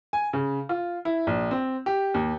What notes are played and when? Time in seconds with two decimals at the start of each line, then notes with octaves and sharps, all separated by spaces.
0.13 G#5
0.33 C#3
0.69 F4
1.05 E4
1.27 A#1
1.51 C4
1.86 G4
2.14 D#2